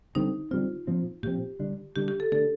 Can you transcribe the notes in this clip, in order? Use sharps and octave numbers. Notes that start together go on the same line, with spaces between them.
D3 G3 C4 D#4
D3 G3 C4 F4
A#2 F3 C4
A#2 F3 C4 G4
D3 G3 D4
D3 G3 D4 G4
G4
A4
D3 A3 D4 A4